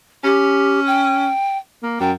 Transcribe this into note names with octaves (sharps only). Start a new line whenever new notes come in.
C#4 G4
G5
A#3
F#2 G5